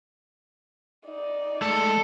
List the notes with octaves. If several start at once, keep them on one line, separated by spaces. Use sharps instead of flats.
D#4 D5
G#3 A3 A4